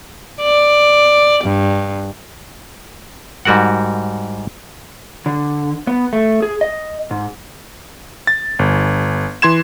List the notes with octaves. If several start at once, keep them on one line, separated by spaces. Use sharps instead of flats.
D5
G2
G#2 G3 F#4 A#4 F#5
D3
B3
A3
G#4
D#5
G#2
A6
G1
E3 C6 G#6 E7